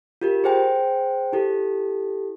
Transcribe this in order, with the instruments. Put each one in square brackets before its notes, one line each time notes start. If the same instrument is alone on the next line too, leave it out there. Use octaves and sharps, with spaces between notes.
[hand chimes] F4 G4 A#4
G#4 C5 G5 G#5
E4 G4 A4